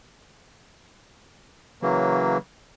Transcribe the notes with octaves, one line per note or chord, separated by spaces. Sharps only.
C#3 E3 F#3 A#3